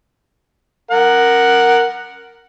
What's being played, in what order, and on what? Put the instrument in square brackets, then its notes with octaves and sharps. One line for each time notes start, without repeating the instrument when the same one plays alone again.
[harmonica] A#4 F#5